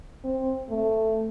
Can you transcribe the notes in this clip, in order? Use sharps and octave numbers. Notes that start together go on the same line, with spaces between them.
C4
A3